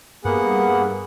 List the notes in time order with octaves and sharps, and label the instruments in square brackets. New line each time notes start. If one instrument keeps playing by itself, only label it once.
[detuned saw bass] G2 [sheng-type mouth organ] A#3 B3 F#5 [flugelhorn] G#4